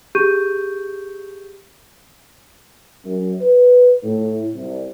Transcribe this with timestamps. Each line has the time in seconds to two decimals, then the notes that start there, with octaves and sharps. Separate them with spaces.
0.15 G4 G#4 C#6 G6 D#7
3.05 F#2
3.41 B4
4.04 A2
4.55 C2